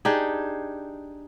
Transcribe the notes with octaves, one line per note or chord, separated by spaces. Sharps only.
D4 D#4 G4 G#4